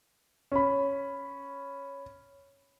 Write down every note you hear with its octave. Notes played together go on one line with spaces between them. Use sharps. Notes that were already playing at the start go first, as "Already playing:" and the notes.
C#4 B5